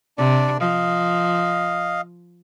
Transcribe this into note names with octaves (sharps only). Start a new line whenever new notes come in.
C3 D4 D5
F3 D#5 F5